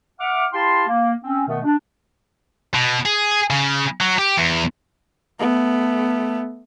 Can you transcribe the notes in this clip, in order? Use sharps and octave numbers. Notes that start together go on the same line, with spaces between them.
E5 F#5 D6 F6
E4 G4 F5 G5 A5 C6
A#3
C4 C#4
B2 D#3 A3 B3
D4
B2
G#4
C#3
F#3
G4
E2
A3 B3